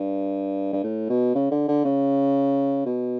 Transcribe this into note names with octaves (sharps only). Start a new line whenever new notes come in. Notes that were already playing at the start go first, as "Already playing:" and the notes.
Already playing: G2
G2
A2
B2
C#3
D3
D3
C#3
B2